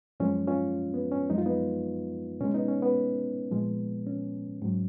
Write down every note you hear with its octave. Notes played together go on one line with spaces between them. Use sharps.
F#2 F3 G#3 C#4
C#4 F4
B3
C#4
F#2 F3 G#3 D#4
F4
B3 D#4
B2 G#3 C#4
B3 D#4
C#4
B3
A#2 F3 G#3
C#4
G#2 F#3